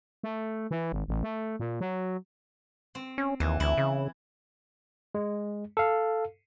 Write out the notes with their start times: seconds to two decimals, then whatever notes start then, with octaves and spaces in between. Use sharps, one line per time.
0.23 A3
0.71 E3
0.92 G#1
1.08 A1
1.23 A3
1.60 A#2
1.81 F#3
2.95 C4
3.18 C#4
3.40 D#2 E3
3.60 D2 E4
3.78 C#3
5.15 G#3
5.77 A4 F5